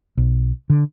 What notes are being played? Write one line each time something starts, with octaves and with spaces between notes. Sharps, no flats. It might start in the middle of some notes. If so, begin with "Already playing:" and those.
B1
D3